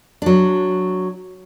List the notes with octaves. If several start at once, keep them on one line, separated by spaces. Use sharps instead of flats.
F#3 D4